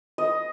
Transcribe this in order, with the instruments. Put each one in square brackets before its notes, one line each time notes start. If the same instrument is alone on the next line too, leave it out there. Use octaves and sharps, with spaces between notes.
[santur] D#5